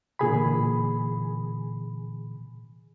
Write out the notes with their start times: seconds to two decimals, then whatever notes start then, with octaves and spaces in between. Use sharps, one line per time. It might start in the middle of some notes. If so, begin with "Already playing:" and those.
0.19 A#2 D3 E3 G#4 G#5 B5